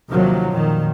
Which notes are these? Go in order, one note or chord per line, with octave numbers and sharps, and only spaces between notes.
D#2 C3 D#3 F3 F#3
F2 A#2 D#3